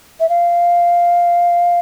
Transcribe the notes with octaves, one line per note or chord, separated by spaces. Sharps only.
E5
F5